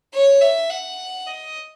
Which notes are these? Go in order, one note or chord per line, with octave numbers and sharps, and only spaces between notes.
C#5
E5
F#5
D#5